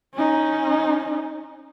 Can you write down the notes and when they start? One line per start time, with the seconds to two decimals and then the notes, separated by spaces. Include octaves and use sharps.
0.14 C#4 D#4